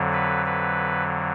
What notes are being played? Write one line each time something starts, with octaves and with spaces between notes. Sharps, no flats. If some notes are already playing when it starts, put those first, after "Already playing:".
Already playing: F2 D3 F#3
B4
B4